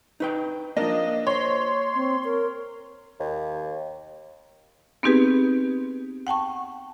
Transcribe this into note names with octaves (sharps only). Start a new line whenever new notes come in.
D#4 B4 G5
F3 A#3 D4 A#4 D#5 F5
C5 C#5 C6
C4
A#4
D#2
B3 C4 D#4 G4 G#4 B4
F#5 G5 A5 C#6